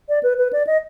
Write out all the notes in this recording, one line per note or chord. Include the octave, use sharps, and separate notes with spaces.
D5
B4
B4
D5
D#5